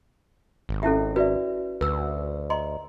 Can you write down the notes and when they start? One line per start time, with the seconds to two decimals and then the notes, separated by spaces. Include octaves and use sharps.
0.69 G#1
0.83 C#4 E4 G4 A4 E5
1.16 F#4 B4 D5 E5
1.81 D2 B4 E6
2.50 D#5 A#5 C6